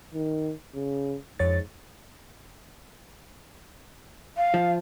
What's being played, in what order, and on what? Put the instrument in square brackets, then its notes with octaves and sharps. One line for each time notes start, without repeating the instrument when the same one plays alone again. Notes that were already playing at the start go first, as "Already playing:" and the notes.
[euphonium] D#3
C#3
[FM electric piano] F2 C#5 A6 [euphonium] G#2
[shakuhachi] F5
[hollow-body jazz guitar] F3